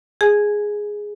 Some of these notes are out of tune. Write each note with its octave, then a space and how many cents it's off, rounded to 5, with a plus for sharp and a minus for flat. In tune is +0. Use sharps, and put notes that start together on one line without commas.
G#4 +0 G#5 +15